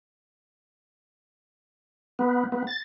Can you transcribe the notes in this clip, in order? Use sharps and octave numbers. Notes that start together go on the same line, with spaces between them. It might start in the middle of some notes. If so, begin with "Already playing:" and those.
B3
B3
A6